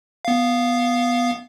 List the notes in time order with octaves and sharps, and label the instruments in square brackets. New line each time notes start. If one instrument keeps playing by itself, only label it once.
[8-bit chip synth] B3 F5